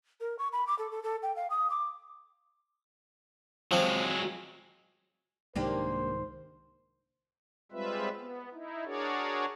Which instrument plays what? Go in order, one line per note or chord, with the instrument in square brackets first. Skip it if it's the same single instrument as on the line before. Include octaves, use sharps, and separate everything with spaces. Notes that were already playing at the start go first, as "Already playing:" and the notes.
[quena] A#4
C#6
B5
D6
A4
A4
A4
G5
F5
D#6
D6
[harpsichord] F3 C4 [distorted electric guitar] F#3 G#3
[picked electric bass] C2 G#2 D#3 [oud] A#3 D4 G4 [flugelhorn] C5
[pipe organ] G3 G#3 C4 F4 B4 E5
B3
D#4 E4
D4 F#4 G#4 A#4 C#5 D5